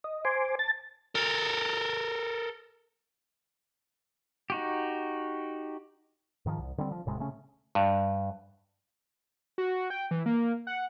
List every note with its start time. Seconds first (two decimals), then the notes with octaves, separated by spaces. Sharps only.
0.04 D#5
0.25 C5 G#5 C6 D6
0.59 A5 A6
1.15 A4 A#4
4.50 D#4 F#4 G4
6.46 G#2 D#3 F3
6.59 C2
6.78 D3 G3 C4
6.91 F3
7.06 D#1 A2 C3 G#3
7.19 C#3 A3 C#4
7.75 G2
9.58 F#4
9.90 G5
10.11 E3
10.26 A#3
10.67 F#5